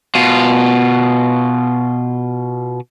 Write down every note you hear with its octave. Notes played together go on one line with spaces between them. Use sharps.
B2 F4